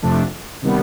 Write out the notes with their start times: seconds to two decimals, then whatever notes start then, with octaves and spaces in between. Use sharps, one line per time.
0.02 F2 C3 F3 A3 D4
0.62 C3 D#3 G3 B3